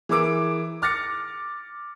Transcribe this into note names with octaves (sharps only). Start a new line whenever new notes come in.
E3 G#4 A#4 D6 E6 D7
D6 F6 A6 A#6 C#7